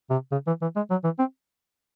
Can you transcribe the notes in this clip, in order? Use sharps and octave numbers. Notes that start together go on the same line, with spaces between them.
C3
C#3
E3
E3
G#3
F#3
E3
C4